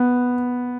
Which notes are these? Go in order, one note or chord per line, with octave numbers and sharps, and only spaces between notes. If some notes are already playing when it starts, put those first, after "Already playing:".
Already playing: B3